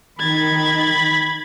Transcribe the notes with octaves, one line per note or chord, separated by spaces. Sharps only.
D#3 B5 G#6 A6